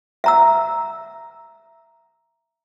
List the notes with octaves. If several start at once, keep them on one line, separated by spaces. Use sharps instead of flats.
E5 A#5 E6